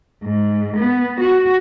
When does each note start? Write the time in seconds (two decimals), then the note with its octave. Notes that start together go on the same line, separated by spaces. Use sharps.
0.23 G#2
0.77 B3
1.19 F#4